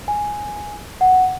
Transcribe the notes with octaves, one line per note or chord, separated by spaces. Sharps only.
G#5
F#5